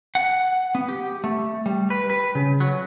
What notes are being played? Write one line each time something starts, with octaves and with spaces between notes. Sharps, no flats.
F#5
B3
G4
A3
G3
B4
B4
C#3
F#3